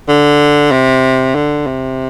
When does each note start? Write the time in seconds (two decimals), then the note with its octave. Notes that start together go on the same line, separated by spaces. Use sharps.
0.09 D3
0.72 C3
1.35 D3
1.67 C3